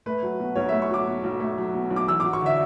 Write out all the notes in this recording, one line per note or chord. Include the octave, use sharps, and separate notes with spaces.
A3 B4
F#3
B2
B1 C#5
A3 E5
C#6
F#3 D6
B2
B1
A3
F#3
B2
B1
D6
E2 E6
D6
F#3
C#6
D3 E5